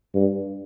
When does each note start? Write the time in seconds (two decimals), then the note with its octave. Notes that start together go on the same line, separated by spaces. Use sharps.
0.15 G2